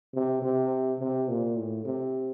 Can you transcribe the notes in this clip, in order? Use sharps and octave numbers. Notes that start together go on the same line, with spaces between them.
C3
C3
C3
A#2
A2
C3